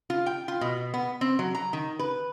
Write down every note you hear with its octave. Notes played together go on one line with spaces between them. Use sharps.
F4
G5
F4
B2
B3
C4
F#3
A#5
D#3
B4